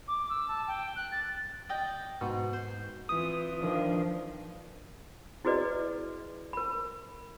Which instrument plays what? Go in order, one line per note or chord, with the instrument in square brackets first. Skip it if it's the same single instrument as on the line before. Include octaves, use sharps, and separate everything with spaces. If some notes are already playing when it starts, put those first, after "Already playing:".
[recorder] D6
E6
A5
G5
F#6
A6
[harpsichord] D5 D#5 G5
[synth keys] G#2 [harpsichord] B2
[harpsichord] C5
[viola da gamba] E3 C4 F4 [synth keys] D#6
[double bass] D#3 F3 [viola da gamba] D4
[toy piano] E4 F#4 G#4 B4 D5 D#5
A#4 B5